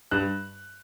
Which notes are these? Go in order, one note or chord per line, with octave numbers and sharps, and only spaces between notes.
G2 F#6